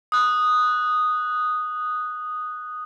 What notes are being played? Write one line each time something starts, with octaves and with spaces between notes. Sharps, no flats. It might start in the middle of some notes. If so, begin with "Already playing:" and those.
D#6 F#6